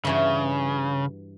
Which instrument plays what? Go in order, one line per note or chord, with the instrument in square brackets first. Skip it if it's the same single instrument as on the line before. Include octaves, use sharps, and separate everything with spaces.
[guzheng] G2 E3 F#4 [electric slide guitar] C#3